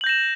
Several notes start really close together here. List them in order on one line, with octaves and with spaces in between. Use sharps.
F#7 G6 A#6 E7